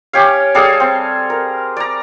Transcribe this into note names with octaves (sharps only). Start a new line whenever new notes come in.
C#4 G4 C#5 F5
G3 G#4 A4 F5
C4
A#4
D5 A#5